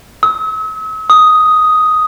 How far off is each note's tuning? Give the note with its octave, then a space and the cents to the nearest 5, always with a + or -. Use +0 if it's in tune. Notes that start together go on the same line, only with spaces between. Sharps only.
E6 -45
D#6 +5